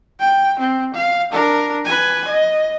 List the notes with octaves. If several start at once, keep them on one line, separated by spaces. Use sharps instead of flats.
G5
C4
F5
D4 A#4
B4 G#5
D#5